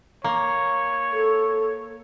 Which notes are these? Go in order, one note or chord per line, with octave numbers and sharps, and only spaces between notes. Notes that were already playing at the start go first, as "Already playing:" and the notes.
A#3 C#5
A4